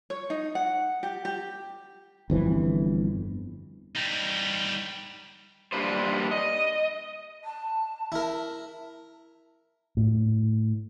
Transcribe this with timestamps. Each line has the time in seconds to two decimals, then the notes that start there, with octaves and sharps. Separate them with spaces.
0.10 C#5
0.30 D#4
0.55 F#5
1.03 G4
1.25 G4
2.30 G1 F2 E3
3.95 G3 D#4
5.72 G3 A#3 D4 B4 C5
6.31 D#5
7.44 A5
8.12 E4 A#4
9.97 A2